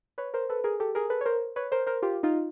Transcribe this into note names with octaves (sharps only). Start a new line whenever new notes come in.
B4 C#5
A#4 C5
A4 B4
G#4 A#4
G4 A4
G#4 A#4
A4 B4
C#5
A#4 C5
B4 C#5
A#4 C5
A#4 C5
F4 G4
D#4 F4